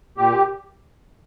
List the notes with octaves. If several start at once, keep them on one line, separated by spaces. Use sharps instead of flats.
A#2 G4